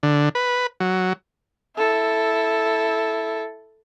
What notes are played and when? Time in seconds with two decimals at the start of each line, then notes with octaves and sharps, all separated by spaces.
0.03 D3
0.35 B4
0.80 F#3
1.77 E4 A4